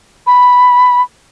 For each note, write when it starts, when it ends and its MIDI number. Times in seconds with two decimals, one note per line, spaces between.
0.27 1.02 83